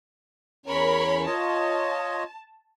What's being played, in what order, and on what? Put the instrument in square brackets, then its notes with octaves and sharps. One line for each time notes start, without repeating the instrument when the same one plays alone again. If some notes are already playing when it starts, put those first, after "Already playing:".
[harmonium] E2 C#4 [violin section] A#4 C#5 B5
[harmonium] F4 C#5 D#5 [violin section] A5